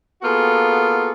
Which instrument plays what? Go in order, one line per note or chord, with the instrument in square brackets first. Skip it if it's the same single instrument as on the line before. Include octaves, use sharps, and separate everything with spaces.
[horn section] A#3 B3 F4 F#4 G#4 A4